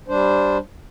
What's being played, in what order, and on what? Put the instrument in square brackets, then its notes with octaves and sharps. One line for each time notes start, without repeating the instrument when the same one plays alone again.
[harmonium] G3 D4 C5